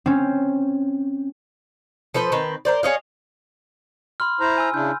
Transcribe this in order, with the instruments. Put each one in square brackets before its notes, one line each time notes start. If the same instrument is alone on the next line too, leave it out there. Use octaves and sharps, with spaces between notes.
[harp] C4 C#4
[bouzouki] F3 A4 B4 C5
D#3 C4 B4
A#4 C5 D5
G#4 C#5 D#5 F5
[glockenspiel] B5 C6 F6
[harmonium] E4 C5 A#5
[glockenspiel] G#5 E6
[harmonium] C#3 D4 E4 [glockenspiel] G6